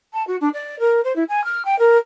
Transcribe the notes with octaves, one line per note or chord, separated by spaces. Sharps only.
A5
F#4
D4
D5
A#4
C5
E4
G#5
F6
G5
A#4